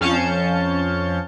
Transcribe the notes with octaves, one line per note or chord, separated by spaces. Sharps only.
F2 C#4 F5 A5 G6 C#7